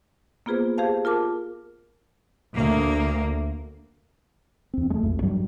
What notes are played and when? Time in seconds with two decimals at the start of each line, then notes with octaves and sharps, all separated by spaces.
0.46 A#3 B3 F4 G#4 B4 C5
0.78 G4 G#4 C5 F5 A5
1.05 F4 A#4 A5 D6
2.55 D2 A#3
4.74 E2 C4
4.90 G#3 A3
5.03 B1 F2
5.22 G2 F#3 G3